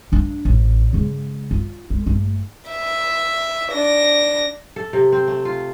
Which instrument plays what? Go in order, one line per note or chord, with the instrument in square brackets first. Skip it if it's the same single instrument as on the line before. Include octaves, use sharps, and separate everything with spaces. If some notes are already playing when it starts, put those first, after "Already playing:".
[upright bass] A#3 D4
A1
C#3 G#3
F4
G#3
G1 A3
[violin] E5
D4 A#6
[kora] A4
C3
C4
A3
F4